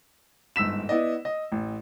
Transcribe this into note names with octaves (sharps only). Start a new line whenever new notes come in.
G1 G#2 E6 B6 E7
B3 E4 D5 D#5
D#5
A1